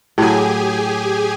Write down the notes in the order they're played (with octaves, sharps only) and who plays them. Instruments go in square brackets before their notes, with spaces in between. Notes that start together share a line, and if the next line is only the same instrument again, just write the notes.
[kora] A2 F#3 [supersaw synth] G4 G#4 G#5